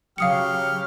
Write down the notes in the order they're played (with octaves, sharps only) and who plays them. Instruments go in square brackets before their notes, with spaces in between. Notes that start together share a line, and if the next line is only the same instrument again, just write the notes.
[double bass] C#3 F#3 [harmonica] G4 F6 [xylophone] F5 D#6 C#7